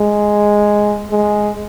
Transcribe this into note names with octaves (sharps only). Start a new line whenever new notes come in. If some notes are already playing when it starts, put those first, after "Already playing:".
Already playing: G#3
G#3